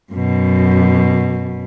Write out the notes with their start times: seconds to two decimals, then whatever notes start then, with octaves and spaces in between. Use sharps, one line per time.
0.12 F#2 B2